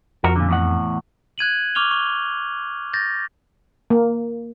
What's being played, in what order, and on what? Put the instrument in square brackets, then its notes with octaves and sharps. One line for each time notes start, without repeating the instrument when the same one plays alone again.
[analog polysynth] F2 [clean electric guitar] F#4 A#4
[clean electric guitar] A#2 D3
E2 A2 F#5
[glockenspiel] F#6 G#6 D#7 F#7
C#6 D6 F6 F7 G7
C#6
G6 A6 A#6
[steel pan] A#3